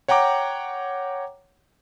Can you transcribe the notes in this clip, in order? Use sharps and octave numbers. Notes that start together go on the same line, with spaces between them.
C#5 F#5 G5 A#5 D6